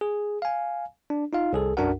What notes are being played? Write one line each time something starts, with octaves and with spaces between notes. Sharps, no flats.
G#4
F5 G#5
D4
D#4 F4 F5
C2 G#4 A4
B1 F#2 D4 F#4 A#4 F#5